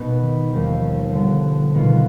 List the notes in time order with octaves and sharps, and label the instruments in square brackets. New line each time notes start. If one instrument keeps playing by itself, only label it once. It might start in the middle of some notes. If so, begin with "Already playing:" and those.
Already playing: [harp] B2 B3 D#4 B4
[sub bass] D#3
[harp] D#2 D#3 G3 [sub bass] F3
[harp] D3 G3 B3
[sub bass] F3
[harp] B2 B3 F4 [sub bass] D#3